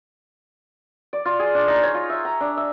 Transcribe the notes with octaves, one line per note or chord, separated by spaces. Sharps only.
D5
F4
G#4
D4
D#4
C#5
F4
E5
A#5
D4
E5